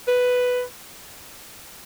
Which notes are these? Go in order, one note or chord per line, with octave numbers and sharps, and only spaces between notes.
B4